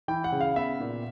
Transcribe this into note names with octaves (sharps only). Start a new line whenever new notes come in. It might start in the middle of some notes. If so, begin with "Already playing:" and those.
E3 G5
F#5
C#3
F5
B3 E5
A#2